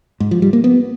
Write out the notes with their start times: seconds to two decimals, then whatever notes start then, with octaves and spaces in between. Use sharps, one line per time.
0.20 G#2
0.31 F3
0.42 G3
0.53 A#3
0.64 B3